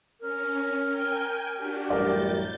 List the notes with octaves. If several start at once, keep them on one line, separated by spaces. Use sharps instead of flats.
C#4 A#4
G5 G#5 G6
D4 F#4 G4
A1 F#2 G3 A#4 D5 G6 A6